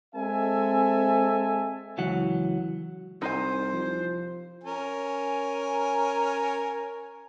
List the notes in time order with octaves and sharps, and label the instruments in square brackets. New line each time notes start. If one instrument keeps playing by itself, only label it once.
[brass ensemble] G#3 C4 A4 E5 G#5
[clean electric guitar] C#2 E3 F#3 F#5
[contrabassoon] C2 [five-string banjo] D#4 G#5 [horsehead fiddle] C5
[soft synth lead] F3
[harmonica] C#4 A#4 G#5